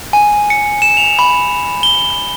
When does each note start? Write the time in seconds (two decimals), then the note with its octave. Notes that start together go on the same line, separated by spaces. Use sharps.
0.13 G#5
0.50 C#7
0.82 E7
0.97 F7
1.19 B5
1.83 G7